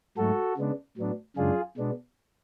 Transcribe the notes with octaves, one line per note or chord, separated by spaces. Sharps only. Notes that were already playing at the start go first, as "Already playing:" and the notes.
G#2 F#3 A3 F#4 A4
C#3 G#3 B3 D4
A2 F#3 B3 D4
F#2 C#3 G#3 D4 F4 G#4
B2 G#3 B3 D4